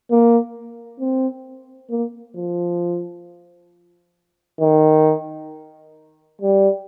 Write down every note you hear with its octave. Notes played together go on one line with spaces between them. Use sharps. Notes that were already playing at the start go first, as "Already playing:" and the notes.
A#3
C4
A#3
F3
D#3
G3